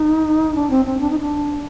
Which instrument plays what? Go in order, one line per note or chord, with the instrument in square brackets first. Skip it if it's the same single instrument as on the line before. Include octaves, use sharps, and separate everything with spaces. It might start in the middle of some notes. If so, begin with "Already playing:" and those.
Already playing: [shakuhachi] D#4
D4
C4
C4
D4
D#4
D4